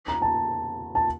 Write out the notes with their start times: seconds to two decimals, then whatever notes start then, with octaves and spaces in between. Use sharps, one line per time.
0.08 A#5
0.22 A5
0.95 A5